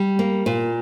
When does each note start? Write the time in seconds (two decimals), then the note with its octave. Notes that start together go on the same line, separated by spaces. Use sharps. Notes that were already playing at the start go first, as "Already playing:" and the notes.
Already playing: G3
0.19 A#3
0.46 A#2